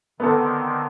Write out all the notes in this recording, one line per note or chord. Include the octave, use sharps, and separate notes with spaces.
D3 D#3 B3 C4 A4